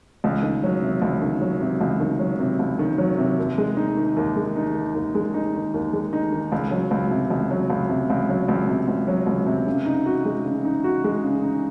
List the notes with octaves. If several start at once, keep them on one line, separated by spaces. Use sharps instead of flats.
C#2
D#3
F#3
C3
C#2
D#3
F#3
C3
C#2
D#3
F#3
C3
C#2
D#3
F#3
C3
D#2
G#3
D#4
D#3
D#2
G#3
D#4
D#3
D#2
G#3
D#4
D#3
D#2
G#3
D#4
D#3
C#2
F#3
C#2
C3
C#2
F#3
C#2
C3
C#2
F#3
C#2
C3
C#2
F#3
C#2
C3
C#3
D#4
F#4
G#3
C#3
D#4
F#4
G#3
C#3
D#4